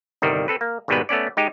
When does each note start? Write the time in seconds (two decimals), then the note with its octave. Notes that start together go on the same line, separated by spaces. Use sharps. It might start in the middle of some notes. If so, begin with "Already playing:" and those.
0.22 G1 C2 D#3 G3
0.48 C4 A4 B4
0.61 A#3
0.88 G#1 G#2 B2 G3 B3 B4
1.09 A3 B3 C#4 D5
1.37 G#3 D#4 G4